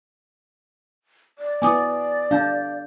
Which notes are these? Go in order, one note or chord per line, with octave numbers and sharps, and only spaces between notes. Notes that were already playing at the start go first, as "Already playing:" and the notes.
D5
B3 E4 G#5 D6 D#6
D4 F5 A5 G6